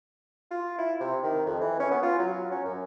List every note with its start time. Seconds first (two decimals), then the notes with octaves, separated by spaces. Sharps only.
0.51 F4
0.78 E4
1.00 C3
1.23 D#3
1.46 F2
1.61 E3
1.80 C#4
1.91 B3
2.03 F4
2.19 F#3
2.51 C#4
2.65 F#2